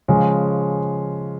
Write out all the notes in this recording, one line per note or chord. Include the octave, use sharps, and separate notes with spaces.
C#3 F3 G#3 C#4